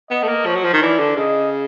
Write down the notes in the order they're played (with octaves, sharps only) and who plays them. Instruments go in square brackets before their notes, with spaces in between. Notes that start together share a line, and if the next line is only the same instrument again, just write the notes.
[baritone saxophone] B3 [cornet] D#5
[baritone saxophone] A3
A#3
[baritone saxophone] F3 [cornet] C#5
[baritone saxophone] F#3
F3
D#3
[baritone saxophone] E3 [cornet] D5
[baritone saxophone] D3
[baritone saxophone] C#3 [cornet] D#5